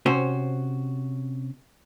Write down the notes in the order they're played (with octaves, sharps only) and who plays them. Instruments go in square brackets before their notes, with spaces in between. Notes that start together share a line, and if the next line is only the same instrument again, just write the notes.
[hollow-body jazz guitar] C3 C#4 F#4 C5